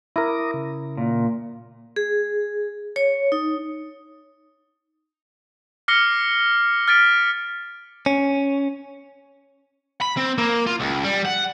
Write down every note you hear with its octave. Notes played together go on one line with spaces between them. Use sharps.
E4 A#4 D6 D#6 A#6
C#3
A#2
G#4
C#5
D#4
D6 F6 A#6 C7 C#7 G7
F6 G#6 A6 B6 D7
C#4
B5
C4
A#3
F4
C#2
G3
F#5